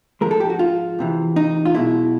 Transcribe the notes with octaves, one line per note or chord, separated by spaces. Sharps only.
G#2 F3 G#3 A#4
A4
G4
F#4
F4
E2 C3 E3
D#4
F4
B1 B2 G#3 E4